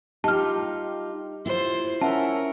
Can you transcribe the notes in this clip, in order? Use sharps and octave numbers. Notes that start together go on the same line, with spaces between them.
D#4 F4 G4 A5 F6
E4 F4 C5
C#4 A#4 E5 F#5 A5